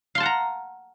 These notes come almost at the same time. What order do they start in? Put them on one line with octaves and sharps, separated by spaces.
F5 C6 A5 F#5 A#5